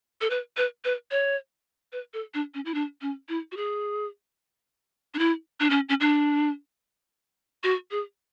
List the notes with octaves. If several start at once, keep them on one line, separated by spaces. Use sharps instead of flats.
A4
B4
B4
B4
C#5
B4
A4
D4
C#4
E4
D4
C#4
E4
F#4
G#4
D4
E4
D4
C#4
C#4
D4
F#4
G#4